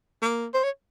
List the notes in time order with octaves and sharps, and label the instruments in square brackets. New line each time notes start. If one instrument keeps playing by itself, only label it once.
[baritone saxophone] A#3
[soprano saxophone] C5
C#5